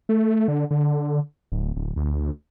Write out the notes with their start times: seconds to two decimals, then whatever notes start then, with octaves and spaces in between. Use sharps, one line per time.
0.09 A3
0.48 D3
0.71 D3
1.52 D1
1.76 D1
1.96 D2